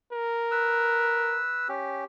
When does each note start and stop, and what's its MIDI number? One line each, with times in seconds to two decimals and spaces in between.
0.13 1.40 70
0.51 1.68 71
0.51 1.68 88
1.68 2.04 61
1.68 2.04 67